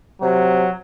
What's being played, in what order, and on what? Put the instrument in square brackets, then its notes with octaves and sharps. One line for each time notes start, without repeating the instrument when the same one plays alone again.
[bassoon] C3 [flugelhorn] F#3